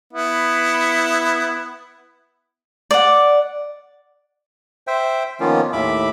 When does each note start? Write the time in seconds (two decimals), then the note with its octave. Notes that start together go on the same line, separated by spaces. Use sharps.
0.13 B3 E4
2.91 D5 F#5
4.87 C5 E5 G5
5.40 D#3 F3 A#3 B3 C#4 F4
5.73 D#2 A2 E5 B5 D6